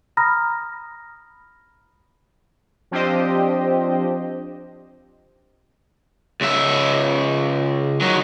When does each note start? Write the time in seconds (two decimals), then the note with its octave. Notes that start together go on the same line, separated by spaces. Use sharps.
0.17 A#5 B5 D#6 F6 A#6
2.91 F3 C4 D4 G4 C5 D#5
6.41 C#2 E5
8.01 D#3 F#3